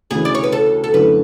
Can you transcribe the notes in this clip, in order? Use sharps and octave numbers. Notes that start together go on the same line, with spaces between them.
D2 C#3 E3 G#4
D5
C#5
B4
A4
A4
F#2 D3 A3 E4 B4